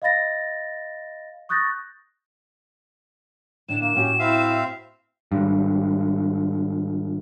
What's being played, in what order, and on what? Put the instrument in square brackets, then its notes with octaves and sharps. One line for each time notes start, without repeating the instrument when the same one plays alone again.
[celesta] D#5 F5 B5 A6 A#6
C#6 D#6 F#6 G6 A6 A#6
[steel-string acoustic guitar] A2 D3 D4 [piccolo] E7
[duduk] A#3 [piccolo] E7
[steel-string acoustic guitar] A2 F#4 F#5 [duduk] C#4 [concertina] G4
[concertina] C4 E5 F5 [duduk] E4
[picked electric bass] G#1 G2